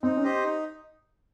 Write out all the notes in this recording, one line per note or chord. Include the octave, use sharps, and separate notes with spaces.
C4 D#4
C#4
G4 C5 D#5
D#4